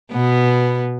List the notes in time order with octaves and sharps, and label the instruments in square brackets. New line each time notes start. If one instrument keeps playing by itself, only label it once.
[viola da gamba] B2 B3